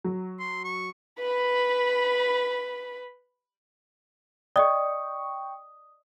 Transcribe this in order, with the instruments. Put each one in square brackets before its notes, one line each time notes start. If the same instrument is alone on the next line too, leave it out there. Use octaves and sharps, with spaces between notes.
[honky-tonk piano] F#3
[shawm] C6
C#6
[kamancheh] B4 B5
[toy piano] D5 D#5 [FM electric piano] G5 C#6 [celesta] D#6